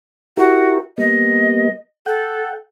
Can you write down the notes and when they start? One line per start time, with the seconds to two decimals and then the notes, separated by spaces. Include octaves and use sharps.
0.37 E4 F#4 G4 A#4
0.98 G3 A#3 B3 D#5
2.06 A4 F#5 G5